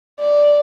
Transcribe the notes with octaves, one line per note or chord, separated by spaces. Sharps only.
D5